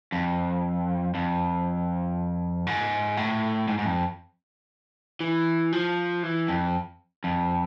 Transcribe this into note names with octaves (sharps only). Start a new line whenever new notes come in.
F2
F2
G#2
A2
G#2
G#2
F2
E3
F3
E3
F2
F2